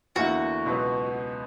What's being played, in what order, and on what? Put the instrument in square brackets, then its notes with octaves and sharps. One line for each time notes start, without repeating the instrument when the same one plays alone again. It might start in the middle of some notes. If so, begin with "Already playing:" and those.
[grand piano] E2 D3 A#3 E4 [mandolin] F#4
[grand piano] C#2 B2 F#3 B3